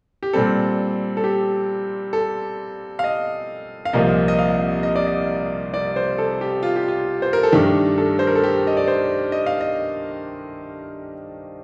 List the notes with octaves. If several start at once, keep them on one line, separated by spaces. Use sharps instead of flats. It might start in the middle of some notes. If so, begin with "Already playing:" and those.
G4
A#2 G3 C4 A4
A4
G4
A4
F5
D#5
F5
C2 A#2 F3 A#3 D#5
D#5
F5
D#5
D5
D#5
D5
C5
A4
G4
F4
G4
F4
C5
A#4
A4
G2 D#3 A3 D4 G4
A4
C5
A#4
A4
G4
D#5
D5
C5
D#5
F5
D#5